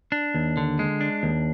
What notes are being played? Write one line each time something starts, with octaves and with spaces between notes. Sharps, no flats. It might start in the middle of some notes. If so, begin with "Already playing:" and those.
D4
D#2
D3
G#3
D4
D#2